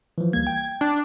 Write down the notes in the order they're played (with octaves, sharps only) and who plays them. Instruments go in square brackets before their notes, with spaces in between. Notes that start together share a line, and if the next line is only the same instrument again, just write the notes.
[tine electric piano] E3 F3
[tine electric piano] C#2 G3 A#3 [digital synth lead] G#6
[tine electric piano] G5
[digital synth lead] D4